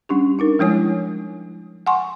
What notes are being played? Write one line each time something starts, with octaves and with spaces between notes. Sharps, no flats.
G3 C#4 D4 G4
D4 D#4 A#4
F3 G#3 E4 C#5 G#5
F#5 G#5 C6 C#6